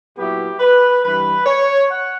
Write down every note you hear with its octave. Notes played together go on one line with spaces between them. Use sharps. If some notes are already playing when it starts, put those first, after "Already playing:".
A#2 F#3 B3 E4 G4
B4
G2 E3 G3 B4
C#5
F#5